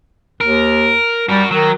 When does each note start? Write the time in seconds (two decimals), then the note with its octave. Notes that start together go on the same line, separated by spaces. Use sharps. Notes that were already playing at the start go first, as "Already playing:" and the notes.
0.41 D#2 A#4
1.29 G3 F#4 A#4
1.51 D#3 F#3